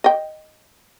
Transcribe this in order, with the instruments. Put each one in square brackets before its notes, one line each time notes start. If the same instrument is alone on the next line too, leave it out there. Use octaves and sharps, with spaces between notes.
[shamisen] D#5 G5